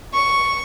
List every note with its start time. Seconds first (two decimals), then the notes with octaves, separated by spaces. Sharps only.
0.14 C#6